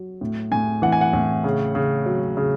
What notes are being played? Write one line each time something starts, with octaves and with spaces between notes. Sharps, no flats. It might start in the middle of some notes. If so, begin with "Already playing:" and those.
Already playing: F#3
A2
A2 G#5
E3 F#5
G#5
F#5
A2
C#3
C#3
F#3
C#3